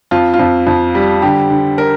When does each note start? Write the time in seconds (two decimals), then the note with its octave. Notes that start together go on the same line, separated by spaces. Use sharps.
0.11 F2 F4
0.34 F4
0.39 F2
0.67 F2
0.95 G3
1.22 D3 G4
1.50 D3
1.78 A#4